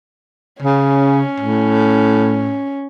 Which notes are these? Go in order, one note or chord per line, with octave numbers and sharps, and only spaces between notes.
C#3 C#4
A2